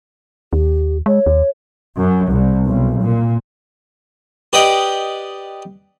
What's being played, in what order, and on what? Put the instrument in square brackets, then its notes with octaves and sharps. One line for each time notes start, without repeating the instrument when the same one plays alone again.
[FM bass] D#2 [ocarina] G4
[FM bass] G#3 [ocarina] C#5
[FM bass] D#2
[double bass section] F#2
C2
B1
A#2
[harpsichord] G4 B4 D5 D#5 F#5 G5